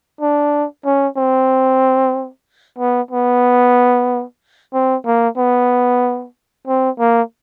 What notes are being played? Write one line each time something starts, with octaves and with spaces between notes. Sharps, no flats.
D4
C#4
C4
B3
B3
C4
A#3
B3
C4
A#3